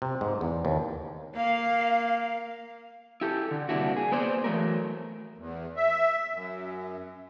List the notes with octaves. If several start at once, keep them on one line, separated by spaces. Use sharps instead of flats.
C3
G#2
E2
D#2
A#3 F5
E4 G4 A4
D3
G2 C3 A#3 D4 E4 F#4
G#4
A#3 B3 C5 D5
E3 F#3 A3 A#4
E2
E5
F#2